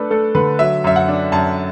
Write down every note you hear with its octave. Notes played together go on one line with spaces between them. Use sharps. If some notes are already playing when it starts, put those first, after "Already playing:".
Already playing: A3 D4 A4 B4
A3 A4
D3 B4
F#3 E5
F#2 E5
F#5
D4
F#2 A5